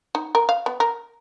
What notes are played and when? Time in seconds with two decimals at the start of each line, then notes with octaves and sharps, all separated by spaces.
0.15 D#4
0.35 A#4
0.49 F5
0.66 B3
0.80 A#4